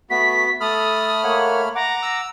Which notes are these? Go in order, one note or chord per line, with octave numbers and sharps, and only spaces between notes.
A3 B3 F#4 B6
A3 A4 B5 D#6 F6
A#3 C#5 F#5
F#5 A#5 D6
E6